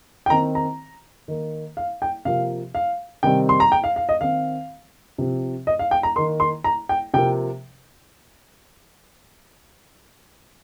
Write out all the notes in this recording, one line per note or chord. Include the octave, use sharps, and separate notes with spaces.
G5
D#3 C4 A#5
A#5
D#3 A#3
F5
G5
C3 F3 A#3 F5
F5
C3 D#3 G3 C4 G5
C6
A#5
G5
F5
F5
D#5
D#3 C4 F5
C3 F3 C4
D#5
F5
G5
A#5
D#3 A#3 C6
C6
A#5
G5
C3 F3 A#3 G5